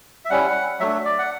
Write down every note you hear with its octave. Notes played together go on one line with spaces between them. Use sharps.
E5
G3 C#4 E4 F#5
F#3 A3 D4 E5
D5
F#5